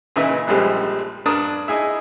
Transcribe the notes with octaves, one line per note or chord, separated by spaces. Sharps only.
A#2 C#3 E3 D#4 E5
A#1 F3 G3 G#3 F#6
G2 D4 A#4 D#6
D#4 E4 G#4 E5